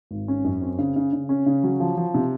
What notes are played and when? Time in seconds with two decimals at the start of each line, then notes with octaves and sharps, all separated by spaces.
0.11 G#1
0.28 C#4
0.44 F#2
0.61 C4
0.79 C#3
0.96 C#3
1.13 C#3
1.29 C#4
1.46 C#3
1.64 F#3
1.80 F3
1.97 F3
2.14 C3